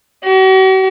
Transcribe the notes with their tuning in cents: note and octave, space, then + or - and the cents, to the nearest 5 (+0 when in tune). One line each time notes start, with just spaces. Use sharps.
F#4 +45